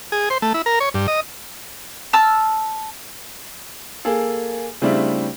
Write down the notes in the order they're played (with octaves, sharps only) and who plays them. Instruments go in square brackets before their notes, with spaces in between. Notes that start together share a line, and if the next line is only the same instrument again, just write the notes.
[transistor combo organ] G#4
C5
A3
E4
A#4
C#5
G2
D#5
[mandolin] A5 E6 F6
[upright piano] A#3 G#4 A4
C#3 G3 A3 C4 D4 E4